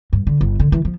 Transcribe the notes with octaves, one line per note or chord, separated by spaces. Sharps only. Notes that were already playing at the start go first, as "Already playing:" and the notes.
G2
D3
G1
D3
E3
F3